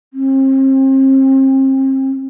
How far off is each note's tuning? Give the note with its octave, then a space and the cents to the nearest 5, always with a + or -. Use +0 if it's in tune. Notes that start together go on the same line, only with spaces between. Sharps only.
C4 +35